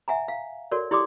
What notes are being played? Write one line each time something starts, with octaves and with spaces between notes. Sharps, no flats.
E5 F#5 G#5 A#5
F5
F#4 A4 A#4 C#5 D5
E4 G4 D5 C6 D6 D#6